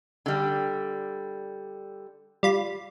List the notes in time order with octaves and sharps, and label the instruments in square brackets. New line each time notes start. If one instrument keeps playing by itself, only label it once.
[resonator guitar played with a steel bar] D3 G3
[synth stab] G3 F4 B5